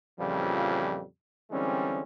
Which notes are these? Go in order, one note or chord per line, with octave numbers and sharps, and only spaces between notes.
F2 A#2 C#3 E3 F3 G3
D3 E3 G3 G#3 C4 C#4